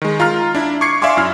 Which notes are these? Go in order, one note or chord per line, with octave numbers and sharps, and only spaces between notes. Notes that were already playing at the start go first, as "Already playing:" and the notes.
D#3 G#3
F4 A#5 F6
D4 E4
C#6 D6 G#6 C7 C#7
D5 E5 F5 G#5 C6 D6
F#2 E4 F6